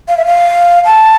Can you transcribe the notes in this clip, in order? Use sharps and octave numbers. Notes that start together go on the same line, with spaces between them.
F5
E5
F5
A5